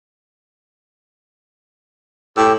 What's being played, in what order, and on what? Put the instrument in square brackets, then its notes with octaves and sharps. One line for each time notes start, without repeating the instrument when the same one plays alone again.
[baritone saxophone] A2 [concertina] G4 E6